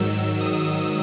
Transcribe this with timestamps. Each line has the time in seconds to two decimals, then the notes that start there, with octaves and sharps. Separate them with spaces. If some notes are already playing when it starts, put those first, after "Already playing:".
Already playing: G#2 D#3 F#3 E6
0.41 D#6